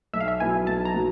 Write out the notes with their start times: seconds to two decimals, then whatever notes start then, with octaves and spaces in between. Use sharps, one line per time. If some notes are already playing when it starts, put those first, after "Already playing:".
0.13 B1 E5
0.20 F5
0.28 E5
0.40 B2 F#3 B3 E4 G#5
0.67 B1 A5
0.85 A#5
0.94 B2 F#3